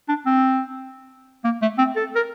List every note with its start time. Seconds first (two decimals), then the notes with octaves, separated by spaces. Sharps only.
0.09 D4
0.26 C4
1.44 A#3
1.62 A3
1.78 C4
1.96 A4
2.16 A#4